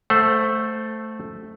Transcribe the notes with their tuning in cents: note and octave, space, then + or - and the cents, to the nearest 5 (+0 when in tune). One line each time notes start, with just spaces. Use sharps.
A3 +0 C5 +0 F#5 -25